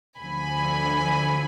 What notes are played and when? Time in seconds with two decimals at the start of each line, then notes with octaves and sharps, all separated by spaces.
0.19 D2 D3 F3 G#5 B5